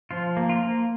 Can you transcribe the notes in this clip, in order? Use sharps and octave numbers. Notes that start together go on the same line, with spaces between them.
F3 F4
A#3
F4
A#3